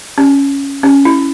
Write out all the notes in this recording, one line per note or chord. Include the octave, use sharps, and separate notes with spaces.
C#4
C#4
E4